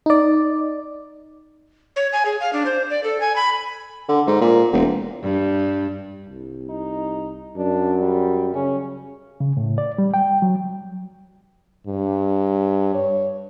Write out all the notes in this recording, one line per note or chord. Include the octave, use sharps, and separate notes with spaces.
D#4 D5
C#5
G#5
G#4
F5
D4
C5
D5
A4
G#5
B5
D3
G#2
A#2
E1
G2
C2
D#4
F#2 D4
G3
C#3 C#4
C#3
A2
D5
G3
G5
F#3
G2
C#5